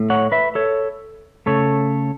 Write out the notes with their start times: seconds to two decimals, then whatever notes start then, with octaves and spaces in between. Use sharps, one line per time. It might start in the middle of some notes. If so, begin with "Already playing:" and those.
Already playing: A2 A3
0.10 C#5 F#5
0.32 B4 E5
0.55 A4 C#5
1.46 C#3 A3 A4 C#5